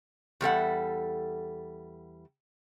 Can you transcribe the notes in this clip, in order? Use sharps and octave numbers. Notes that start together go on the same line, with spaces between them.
E2 G3 A4 F#5